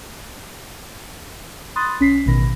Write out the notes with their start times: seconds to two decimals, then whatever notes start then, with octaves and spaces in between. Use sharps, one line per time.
1.76 B5 C6 D#6 F#6 A6
1.99 B1 C#4 B6 C7
2.26 A1 B2 D#3 B5 A#6